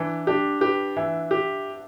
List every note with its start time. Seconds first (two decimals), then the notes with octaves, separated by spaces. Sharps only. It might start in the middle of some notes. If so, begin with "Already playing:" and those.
Already playing: E3 D4
0.27 D4 G4
0.61 G4 B4
0.97 E3 E5
1.31 G4